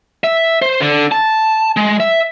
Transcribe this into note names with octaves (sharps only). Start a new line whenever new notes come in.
E5
C5
D3
A5
G#3
E5